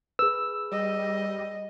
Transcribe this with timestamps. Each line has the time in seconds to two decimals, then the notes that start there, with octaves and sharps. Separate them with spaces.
0.19 G#4 B4 E6
0.72 G3 D#5